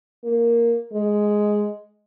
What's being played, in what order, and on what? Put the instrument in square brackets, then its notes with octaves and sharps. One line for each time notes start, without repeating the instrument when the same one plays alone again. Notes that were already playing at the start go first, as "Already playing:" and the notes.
[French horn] A#3
G#3